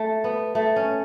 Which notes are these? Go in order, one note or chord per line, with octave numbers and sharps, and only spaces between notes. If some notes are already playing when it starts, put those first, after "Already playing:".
Already playing: A3
B3
A3
C#4